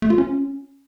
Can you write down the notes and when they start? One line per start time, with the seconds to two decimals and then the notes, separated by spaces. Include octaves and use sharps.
0.02 A3
0.10 F4
0.18 C#4